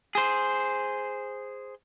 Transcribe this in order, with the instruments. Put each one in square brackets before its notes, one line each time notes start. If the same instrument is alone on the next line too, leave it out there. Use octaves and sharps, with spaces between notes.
[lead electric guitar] G#4 C5